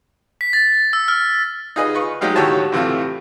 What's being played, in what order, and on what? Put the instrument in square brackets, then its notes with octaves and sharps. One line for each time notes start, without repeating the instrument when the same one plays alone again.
[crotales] B6
A6
E6
F6
[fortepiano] D#4 F4 G#4 B4 D#5
F4 B4 C#6
F#3 G#3 D#4 G4 F5
D#2 A2 F#4 G4 C#5 A5
A2 C3 E3 A3 F4